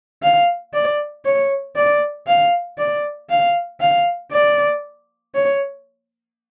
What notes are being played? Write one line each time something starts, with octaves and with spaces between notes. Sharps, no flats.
F5
D5
C#5
D5
F5
D5
F5
F5
D5
C#5